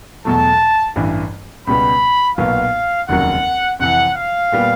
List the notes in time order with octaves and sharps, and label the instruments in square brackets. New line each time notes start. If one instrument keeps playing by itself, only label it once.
[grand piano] E2 B2 F#3 A3 [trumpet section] A5
[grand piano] A1 G2 E3
[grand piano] C#2 B2 G3 B3 [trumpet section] B5
[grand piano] B1 A#2 F#3 B3 [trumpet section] F5
[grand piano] F1 D#2 C#3 F#3 A#3 [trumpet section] F#5
[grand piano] F2 C3 E3 [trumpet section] F#5
[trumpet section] F5
[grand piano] A#2 G3 B3